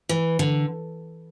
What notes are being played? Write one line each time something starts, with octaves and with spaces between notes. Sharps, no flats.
E3
D3